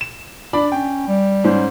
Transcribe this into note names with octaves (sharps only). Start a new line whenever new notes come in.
E7
D4 D5 B5
C#4 G5
G3
G#2 C#4 C5